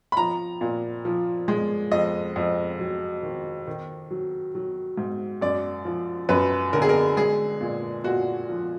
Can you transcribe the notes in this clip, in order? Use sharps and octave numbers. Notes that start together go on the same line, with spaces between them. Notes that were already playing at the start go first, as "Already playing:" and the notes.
B5
F3 A#5
A#2
F3
G#3
F2 D#5
F2
F#3
D#3
D#3
F#3
F#3
G#2
F#2 D5
F3
F#2 B4
D3 A#4
G#4
A#4
G#3 G#4
A#2
A#2 F#4
F3